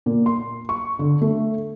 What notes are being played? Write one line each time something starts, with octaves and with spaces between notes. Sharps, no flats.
A#2
C6
C#6
D3
A3